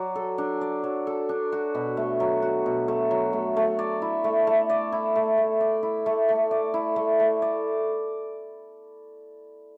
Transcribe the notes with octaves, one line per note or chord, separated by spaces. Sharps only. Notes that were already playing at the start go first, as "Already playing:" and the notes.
Already playing: F#3 D5
A4
D4
D5
F#3
A4
D4
F#4
B2
A3
F#3
F#4
B2
A3
F#3
A3
A3
D5
E4
A3
A3
D5
E4
A3
A3
D5
E4
A3
A3
D5
E4
A3
A3
D5